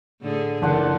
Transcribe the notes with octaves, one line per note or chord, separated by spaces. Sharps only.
A2 D3 G#4
F#1 D3 F3 D4 F#5 D6